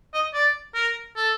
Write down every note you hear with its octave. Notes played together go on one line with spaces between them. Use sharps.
D#5
D5
A#4
A4